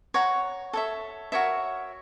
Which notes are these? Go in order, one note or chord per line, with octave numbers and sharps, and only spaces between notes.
C#5 F#5 A#5
A4 C#5 E5
F#4 A#4 C#5 E5